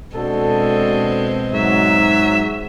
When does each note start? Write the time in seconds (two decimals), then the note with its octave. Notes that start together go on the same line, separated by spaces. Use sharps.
0.16 B2 G#3 C4 D4 F#4 A4
1.53 G#2 F#3 E5